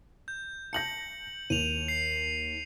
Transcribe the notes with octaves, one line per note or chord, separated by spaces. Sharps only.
G6
A5 G6 A#6 C#7 F#7
D#2 D#7 F7
C7